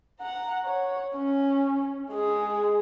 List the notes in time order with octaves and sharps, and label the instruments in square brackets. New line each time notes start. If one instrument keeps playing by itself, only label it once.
[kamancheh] F#5 A#5
C#5
C#4
G#3 G#4